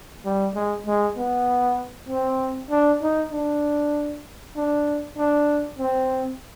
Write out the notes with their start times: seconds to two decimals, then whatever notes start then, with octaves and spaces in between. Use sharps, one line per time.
0.25 G3
0.55 G#3
0.86 G#3
1.17 B3
2.09 C4
2.71 D4
3.02 D#4
3.32 D4
4.56 D4
5.18 D4
5.79 C4